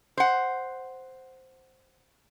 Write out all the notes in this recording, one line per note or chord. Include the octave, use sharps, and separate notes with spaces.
C5 F#5